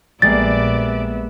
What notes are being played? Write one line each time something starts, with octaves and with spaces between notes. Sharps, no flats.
A#1 G3 G#3 A#3 B3 D5 E5 A6